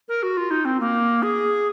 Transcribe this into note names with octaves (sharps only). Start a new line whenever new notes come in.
A#4
F#4
F4
D#4
C4
A#3
G#4